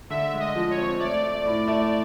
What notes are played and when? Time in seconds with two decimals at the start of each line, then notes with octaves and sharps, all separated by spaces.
0.10 D3 E5
0.33 G#3
0.40 D#5
0.55 F3
0.71 C#5
0.78 C4
1.00 A3 D5
1.23 A3
1.45 A2
1.67 A3